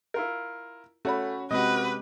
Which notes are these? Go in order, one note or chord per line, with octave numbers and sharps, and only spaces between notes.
E4 F4 A#4
A3 C#4 F#4 C#5 B5
C3 G#3 C4 F#4 G4 B4 D#5